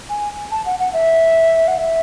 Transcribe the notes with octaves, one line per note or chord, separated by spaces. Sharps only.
G#5
A5
F#5
F#5
E5
F#5
E5